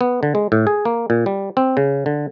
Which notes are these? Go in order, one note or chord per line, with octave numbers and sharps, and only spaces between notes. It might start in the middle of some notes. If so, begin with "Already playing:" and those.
B3
D3
G#3
A2
G#4
A#3
A#2
G3
C4
C#3
D3